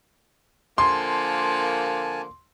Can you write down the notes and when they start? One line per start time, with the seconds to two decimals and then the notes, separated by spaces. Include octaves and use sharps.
0.78 D3 F3 A#3 G#5 A5 C6